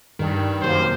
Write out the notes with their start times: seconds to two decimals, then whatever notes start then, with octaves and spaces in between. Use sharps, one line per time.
0.19 G2 D#3
0.62 F#2 C3 A#3 C5